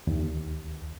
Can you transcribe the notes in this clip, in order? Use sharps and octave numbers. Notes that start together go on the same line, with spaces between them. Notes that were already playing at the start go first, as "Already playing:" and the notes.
D#2